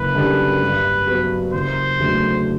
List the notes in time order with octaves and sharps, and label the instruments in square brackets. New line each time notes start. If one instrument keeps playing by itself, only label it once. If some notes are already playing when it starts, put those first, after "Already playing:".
Already playing: [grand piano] F#1 [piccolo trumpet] B4
[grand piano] F#2 D3 G3
G2
F#3 B3
[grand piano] F#1 [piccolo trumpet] C5
[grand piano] E2 D3 F#3 A3